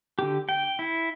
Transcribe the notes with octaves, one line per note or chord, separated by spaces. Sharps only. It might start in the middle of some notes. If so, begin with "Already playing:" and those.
D3 G4
G5
E4